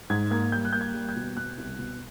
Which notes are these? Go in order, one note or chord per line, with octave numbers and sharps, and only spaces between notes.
G#2 G#6
A#3 G#6
G3 G6
F#6
A#3 G6
G#6
G3
G6
B2
B2 F#6
C2
B2